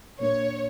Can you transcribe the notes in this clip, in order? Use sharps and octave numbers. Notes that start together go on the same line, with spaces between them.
A#2 A#3 D4 C#5